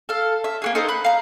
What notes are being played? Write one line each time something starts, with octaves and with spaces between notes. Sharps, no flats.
A4 F5
E5
A#3 F#4 G#4
D#4 A4 A#4 C5
B5 F#6
F5 A#5